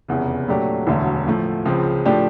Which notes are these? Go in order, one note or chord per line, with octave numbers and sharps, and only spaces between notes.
F1 E2 C#3
A#2 F#3 A3 D4 G4
E1 D2 D3 F#3 A3
A2 F3 A3
C#2 C#3 F3 G#3 C4
A2 F3 A3 D4 G4